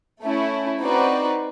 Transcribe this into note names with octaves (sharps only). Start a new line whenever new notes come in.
A3 C#4 E4
C4 D#4 F#4 B4 D5